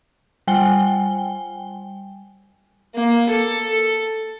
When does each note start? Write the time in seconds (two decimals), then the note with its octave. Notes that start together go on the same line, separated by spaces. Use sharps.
0.47 G3 G5 G#5 G7
2.95 A#3
3.30 A4